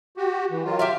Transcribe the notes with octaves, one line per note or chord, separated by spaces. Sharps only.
F#4 G4
E3
D#3 F#3 F4
G4 E5 F5